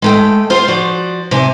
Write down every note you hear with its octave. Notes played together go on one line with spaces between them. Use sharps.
G#3 A3 G5
F4 G#4 C5 F5
F3 F#4 D5
C3 D4 G#5